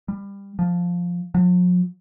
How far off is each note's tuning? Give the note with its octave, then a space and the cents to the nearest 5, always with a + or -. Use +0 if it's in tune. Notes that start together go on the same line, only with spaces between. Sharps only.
G3 +20
F3 +5
F3 +45